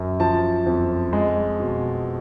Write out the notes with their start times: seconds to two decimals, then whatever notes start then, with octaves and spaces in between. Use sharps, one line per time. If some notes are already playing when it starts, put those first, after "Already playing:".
Already playing: F#2
0.20 F3 A5
0.66 F2
1.13 G#3
1.60 B2